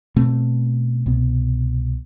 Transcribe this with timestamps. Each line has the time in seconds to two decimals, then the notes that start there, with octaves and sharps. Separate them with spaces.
0.16 B2 A3 C4
1.06 C2 B2 B3